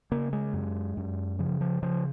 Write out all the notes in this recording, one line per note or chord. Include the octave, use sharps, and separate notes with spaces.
C#3 A#3
G#3
F#2
F#2
C#3 F3
F3
C#3 F3